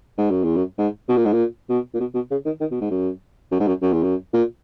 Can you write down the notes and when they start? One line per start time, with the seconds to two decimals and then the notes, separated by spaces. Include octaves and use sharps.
0.18 G#2
0.31 F#2
0.43 E2
0.56 F#2
0.78 G#2
1.09 B2
1.17 A#2
1.25 G#2
1.33 A#2
1.69 B2
1.94 A#2
2.00 B2
2.15 B2
2.31 C#3
2.46 D#3
2.61 D#3
2.71 B2
2.81 G#2
2.91 F#2
3.51 F#2
3.60 G#2
3.68 F#2
3.82 F#2
3.93 E2
4.03 F#2
4.33 A#2